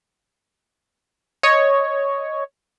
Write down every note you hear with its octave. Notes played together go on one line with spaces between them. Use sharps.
C#5 D#5